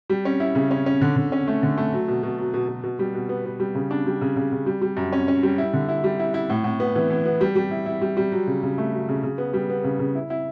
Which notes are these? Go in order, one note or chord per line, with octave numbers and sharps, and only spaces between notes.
G3
C#4
E4
C#3
C#4
C#4
D3
D3
C#4
A3
D3
A3
F#3
B2
B2
F#3
B2
B2
B2
G3
B2
B3
B3
G3
C#3
D4
G3
C#3
C#3
C#3
G3
G3
F#2
C#4
C#4
G3
E4
D3
E4
G3
E4
E4
A2
A2
B3
E3
E3
B3
G3
G3
E4
E4
G3
G3
F#3
C#3
C#3
A3
F#3
C#3
C#3
B3
G3
B3
C#3
C#3
E4
E4